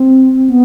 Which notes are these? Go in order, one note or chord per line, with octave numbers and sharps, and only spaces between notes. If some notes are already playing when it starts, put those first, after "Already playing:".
Already playing: C4
B3